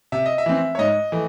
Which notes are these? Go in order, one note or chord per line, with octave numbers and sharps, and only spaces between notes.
C3 E5
D#5
E5
E3 C4
C#5
G#2 D#5
E3 A3